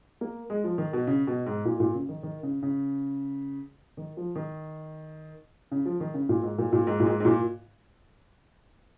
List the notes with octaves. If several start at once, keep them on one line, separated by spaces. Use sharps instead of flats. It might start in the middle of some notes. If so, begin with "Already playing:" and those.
A#3
G#3
F3
D#3
B2
C#3
B2
G#2
A#2
A#2
C#3
D#3
D#3
C#3
C#3
D#3
F3
D#3
C#3
F3
D#3
C#3
A#2
G#2
A#2
A#2
G#2
A#2
G#2
G#2
A#2